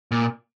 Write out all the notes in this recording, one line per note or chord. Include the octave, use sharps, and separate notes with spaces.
A#2